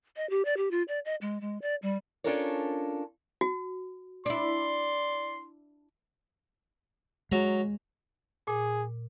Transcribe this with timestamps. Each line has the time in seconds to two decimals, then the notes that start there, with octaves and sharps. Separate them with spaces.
0.16 D#5
0.30 G4
0.45 D5
0.57 G4
0.71 F4
0.88 D5
1.05 D#5
1.21 G#3
1.41 G#3
1.62 D5
1.82 G3
2.24 C#4 D4 F4 A4 A#4 C#5
3.41 F#4
4.26 D4 E4 D5 C6
7.32 F#3 G#3 A#5
8.48 A#2 G#4